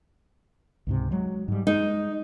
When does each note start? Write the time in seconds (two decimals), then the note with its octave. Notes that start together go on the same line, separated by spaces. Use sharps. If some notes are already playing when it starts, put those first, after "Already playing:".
0.87 C#2 G#2 C3
1.11 F#3 G#3
1.48 G#2 G3
1.67 G#3 D#4